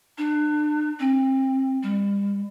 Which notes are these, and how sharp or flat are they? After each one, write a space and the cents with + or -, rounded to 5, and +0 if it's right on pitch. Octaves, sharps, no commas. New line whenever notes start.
D4 +35
C4 +30
G3 +40